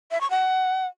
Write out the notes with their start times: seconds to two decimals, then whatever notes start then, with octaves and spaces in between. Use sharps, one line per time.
0.11 E5
0.21 C#6
0.30 F#5